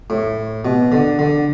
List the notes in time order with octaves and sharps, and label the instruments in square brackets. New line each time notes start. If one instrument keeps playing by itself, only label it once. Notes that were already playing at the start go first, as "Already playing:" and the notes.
[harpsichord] A2
B2
D3
D3